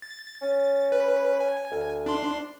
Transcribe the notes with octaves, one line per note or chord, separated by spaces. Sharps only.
A6
C#4
B4
G#5
D2
D4 C6